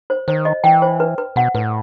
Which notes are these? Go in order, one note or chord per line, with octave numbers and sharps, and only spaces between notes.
C5
D#3 C5
D#5
E3 G5
C5
B4
B4
B2 F#5
A2 B4